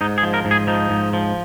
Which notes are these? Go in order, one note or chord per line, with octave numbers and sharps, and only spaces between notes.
G#2 D#4
G#4
F3
A#4
G#2
G#4
F3 D#4
G#2
F3